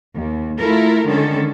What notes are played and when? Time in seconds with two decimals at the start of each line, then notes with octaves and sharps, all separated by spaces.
0.14 D#2
0.59 A3 E4 F4 A4 A#4
1.06 D3 D#3 G#3 C#4 A4